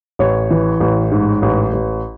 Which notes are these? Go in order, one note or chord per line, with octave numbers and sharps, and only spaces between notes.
A1 C#5
E3
A1
G#2
A1
A1